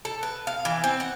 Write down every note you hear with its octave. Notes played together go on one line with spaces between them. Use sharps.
A4
B4
F5
E3
C4
F#5